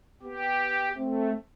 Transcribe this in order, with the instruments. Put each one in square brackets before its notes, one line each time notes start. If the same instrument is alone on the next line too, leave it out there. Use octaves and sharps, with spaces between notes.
[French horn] B3 [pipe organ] G4
[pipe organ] A3 [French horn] C4